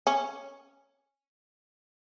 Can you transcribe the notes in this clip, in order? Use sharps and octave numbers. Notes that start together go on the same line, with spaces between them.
C#4